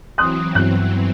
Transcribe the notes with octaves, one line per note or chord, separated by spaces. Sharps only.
E3 F#3 C4 C6 D#6 F#6
G2 B3 F#6